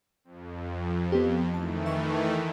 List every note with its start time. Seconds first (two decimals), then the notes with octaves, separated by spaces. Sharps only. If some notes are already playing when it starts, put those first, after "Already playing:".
0.24 F2
1.12 B3 G4
1.54 D#3 E3 A3 A5
1.86 E5 C#6